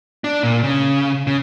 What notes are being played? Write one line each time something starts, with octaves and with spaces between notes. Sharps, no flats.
D4
A#2
C#3
C#3